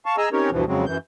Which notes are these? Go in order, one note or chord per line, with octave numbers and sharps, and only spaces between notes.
F5 A5 C#6
G#4 D#5 G#5 A#5 E6
C4 C#4 D#4 G4 A#4 C#5
D2 G2 B2 E3 F3
F2 C#3 F#3 G#3 C4
F#2 E3 G6